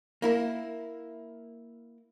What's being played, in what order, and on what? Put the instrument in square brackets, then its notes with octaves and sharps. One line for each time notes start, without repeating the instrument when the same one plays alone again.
[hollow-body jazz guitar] A#3 E4 A#4